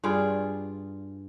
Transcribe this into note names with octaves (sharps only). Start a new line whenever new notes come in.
G2 F4 G#4 D5